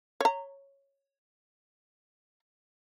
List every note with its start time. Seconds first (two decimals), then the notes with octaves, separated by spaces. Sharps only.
0.21 C#5 A#5